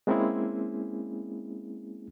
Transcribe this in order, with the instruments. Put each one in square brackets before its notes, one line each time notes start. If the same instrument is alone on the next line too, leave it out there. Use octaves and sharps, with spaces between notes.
[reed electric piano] G#3 A#3 C4 C#4 E4 G#4